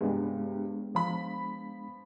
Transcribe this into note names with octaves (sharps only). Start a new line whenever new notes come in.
G2 C3 G#3 B3 D4
F3 B5